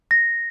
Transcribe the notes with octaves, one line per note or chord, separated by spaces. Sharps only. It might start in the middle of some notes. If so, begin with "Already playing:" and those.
A#6